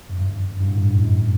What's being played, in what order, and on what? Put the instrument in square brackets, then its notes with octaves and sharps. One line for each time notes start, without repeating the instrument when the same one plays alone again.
[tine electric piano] F#2
G2
G2
A2
G2
F#2 A2